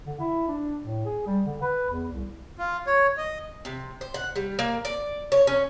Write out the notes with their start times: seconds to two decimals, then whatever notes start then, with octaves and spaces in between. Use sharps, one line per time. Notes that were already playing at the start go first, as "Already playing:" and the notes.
0.06 D3
0.20 E4
0.48 D4
0.83 A2
1.05 G#4
1.26 G3
1.45 D3
1.62 B4
1.90 E2
2.12 C2
2.59 F4
2.87 C#5
3.17 D#5
3.65 C3
4.01 C5
4.14 F#5
4.36 G3
4.59 A#3
4.85 D5
5.32 C#5
5.47 C#4